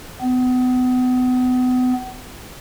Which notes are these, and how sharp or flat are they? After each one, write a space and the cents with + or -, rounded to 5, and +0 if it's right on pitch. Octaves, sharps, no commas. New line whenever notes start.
B3 +35